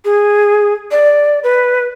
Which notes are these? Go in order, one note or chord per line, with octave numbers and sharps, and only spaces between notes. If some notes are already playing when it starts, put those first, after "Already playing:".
G#4
D5
B4